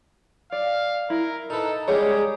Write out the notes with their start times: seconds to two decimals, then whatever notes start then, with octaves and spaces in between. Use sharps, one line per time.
0.52 D5 F5
1.10 E4 A#4
1.50 D#4 A4 B4
1.88 G3 G#3 A#3 G4 G#4 C#5